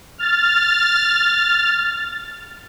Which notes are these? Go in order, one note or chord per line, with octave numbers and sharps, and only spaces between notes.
F6 A6